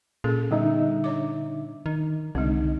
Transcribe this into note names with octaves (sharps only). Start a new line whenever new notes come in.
A#2 C#4 G#4 A4
D3 G3 B3 D#4 E5
D4 C#5 D6
D#3
C2 D3 G#3 C4 D#4